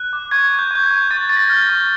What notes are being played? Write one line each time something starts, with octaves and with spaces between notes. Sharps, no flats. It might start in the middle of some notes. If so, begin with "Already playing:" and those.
Already playing: F#6
D6
C#6 G#6
C#6
G6
C#6 G6
G#6
C#6
C#6 A6
C#6 A6
A#6
F6
C#6